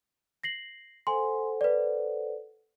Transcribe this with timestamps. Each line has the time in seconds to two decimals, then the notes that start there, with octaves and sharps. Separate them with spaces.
0.43 A#6 C7 F#7
1.07 A4 C5 F#5 G#5 C6
1.61 B4 D5